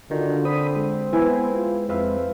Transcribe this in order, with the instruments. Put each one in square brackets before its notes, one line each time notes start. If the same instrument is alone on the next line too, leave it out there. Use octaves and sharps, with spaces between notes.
[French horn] D3 [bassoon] D#3 [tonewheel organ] D4 F4 F#4
[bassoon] C4 [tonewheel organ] B5 D#6
[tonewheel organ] G#3
[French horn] B3 [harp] E4 B4 G#5
[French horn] F4
[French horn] F2 [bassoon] C4 [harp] B4 E5 F5